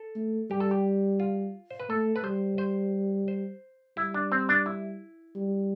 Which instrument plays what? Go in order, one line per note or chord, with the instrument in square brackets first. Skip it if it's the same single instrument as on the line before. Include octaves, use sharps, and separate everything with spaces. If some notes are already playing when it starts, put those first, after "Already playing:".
Already playing: [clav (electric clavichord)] A4
[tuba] A3
[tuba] G3 [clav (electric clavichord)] G4
[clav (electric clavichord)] A4
G4
F4
C5
B4
[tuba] A3 [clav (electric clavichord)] A4
[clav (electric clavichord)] B4
[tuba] G3 [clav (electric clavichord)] C5
[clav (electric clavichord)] C5
C5
[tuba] G3 [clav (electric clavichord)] E4
[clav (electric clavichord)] D4
C4
D4
E4
[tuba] G3